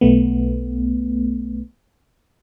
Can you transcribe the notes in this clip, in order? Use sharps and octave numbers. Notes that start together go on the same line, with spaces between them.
B1 A3 B3